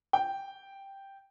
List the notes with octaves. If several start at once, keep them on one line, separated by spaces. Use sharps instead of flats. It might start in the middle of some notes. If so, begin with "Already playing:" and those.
G5